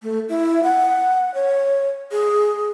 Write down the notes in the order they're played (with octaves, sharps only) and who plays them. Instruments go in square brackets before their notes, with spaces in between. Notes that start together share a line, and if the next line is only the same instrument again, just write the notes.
[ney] A3
E4
F#5
C#5
G#4